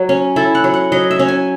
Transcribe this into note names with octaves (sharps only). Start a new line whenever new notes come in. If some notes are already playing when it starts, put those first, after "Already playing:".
Already playing: F#3
C#4
E4 A4
F#5
F#3
F#5
F#3 D#5
E5
C#4
G#5